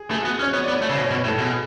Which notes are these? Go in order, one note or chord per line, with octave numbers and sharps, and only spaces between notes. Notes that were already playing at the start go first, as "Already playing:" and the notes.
Already playing: G#4
A3 G#4
B3 F#4
C#4
C#5
B3 C#5
B3 D5
C#5
A3
C#3
B2 C#5
B2 C#5
B4
A2
A4
B2 G#4